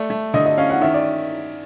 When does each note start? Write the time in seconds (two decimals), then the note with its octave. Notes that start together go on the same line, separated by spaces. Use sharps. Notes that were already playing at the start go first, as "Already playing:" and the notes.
Already playing: A3 D5
0.10 A3
0.34 D3 D#5
0.46 D#5
0.58 C#4 F5
0.70 F#5
0.81 D#3 E5
0.94 D5